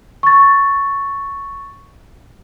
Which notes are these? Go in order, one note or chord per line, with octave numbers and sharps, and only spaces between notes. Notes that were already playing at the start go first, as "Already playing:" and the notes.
C#6 A6